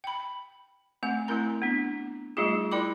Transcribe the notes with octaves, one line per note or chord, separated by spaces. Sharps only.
G5 B5
A3 C4 F#5
A3 C4 E4 A#4 A#5
B3 D4
G3 A3 D#4 F4 G#4
E4 A#4 D5 G5 B5 D6